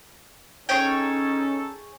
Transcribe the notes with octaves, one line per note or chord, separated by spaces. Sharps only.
C#4 D#4 G#4 A4 C#5 G5